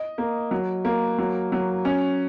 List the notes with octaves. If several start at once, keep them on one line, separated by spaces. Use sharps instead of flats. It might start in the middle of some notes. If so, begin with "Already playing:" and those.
Already playing: D#5
A#3
F#3
A#3
F#3
F#3
C#4